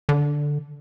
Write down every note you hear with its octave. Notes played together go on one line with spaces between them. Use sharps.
D3